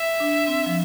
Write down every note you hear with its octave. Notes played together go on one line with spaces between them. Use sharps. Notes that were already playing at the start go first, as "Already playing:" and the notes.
Already playing: E5
D4
C4
F3